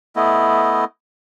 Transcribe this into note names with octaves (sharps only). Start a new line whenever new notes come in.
A3 B3 E4 D#5